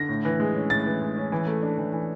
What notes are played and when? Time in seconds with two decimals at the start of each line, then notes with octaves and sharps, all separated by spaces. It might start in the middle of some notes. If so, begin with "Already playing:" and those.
Already playing: D3 A#6
0.09 A2
0.25 E3
0.40 G#3
0.55 C#4
0.70 A2 A6
0.86 E3
1.02 G#3
1.17 C#4
1.32 E3
1.47 A3
1.63 D4
1.78 E3
1.93 E3